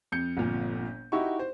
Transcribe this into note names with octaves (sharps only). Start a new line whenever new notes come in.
F2 G6 C#7
G1 F2 A#2
D#4 E4 F#4 G4 C#6
C5